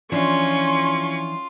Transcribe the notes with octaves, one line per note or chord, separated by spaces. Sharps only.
E3 F3 C#4 D4 F4 C6 C#6